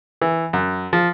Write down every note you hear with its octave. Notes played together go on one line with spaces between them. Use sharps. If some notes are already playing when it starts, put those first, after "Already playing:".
E3
F#2
F3